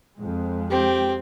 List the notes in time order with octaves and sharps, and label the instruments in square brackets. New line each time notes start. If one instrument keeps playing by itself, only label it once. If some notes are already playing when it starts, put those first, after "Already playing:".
[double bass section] F2 G#3
[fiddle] C4 [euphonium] G4